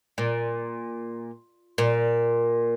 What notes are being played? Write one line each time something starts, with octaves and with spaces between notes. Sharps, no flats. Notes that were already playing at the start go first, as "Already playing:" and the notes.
A#2
A#2